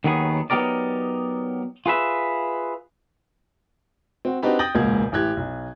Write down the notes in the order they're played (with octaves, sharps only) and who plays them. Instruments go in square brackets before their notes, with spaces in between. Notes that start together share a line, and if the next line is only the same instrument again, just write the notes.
[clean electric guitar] D#2 D#3 F#3 B3 G#4
F#3 B3 D#4 G4 A#4 D5
F4 G#4 B4 E5
[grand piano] C4 F#4
C4 D4 D#4 F#4 G4 B4
G5 D#6 G6 A6 A#6 F#7
E1 C#2 A#2 A#3 F#5 G#6
A1 A2 G4 F#6 G#6
B1